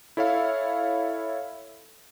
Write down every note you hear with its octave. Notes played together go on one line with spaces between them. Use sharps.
E4 A4 C#5 E5 F5